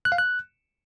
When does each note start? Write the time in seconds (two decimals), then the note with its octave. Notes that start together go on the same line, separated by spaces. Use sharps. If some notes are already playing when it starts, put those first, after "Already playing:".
0.05 F#6
0.12 F5
0.18 F#6